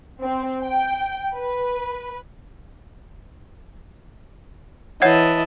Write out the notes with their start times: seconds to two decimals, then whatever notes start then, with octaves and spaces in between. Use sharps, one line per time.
0.21 C4
0.63 G5
1.36 B4
5.02 E3 C#5 D#5 F#5 A5 G#6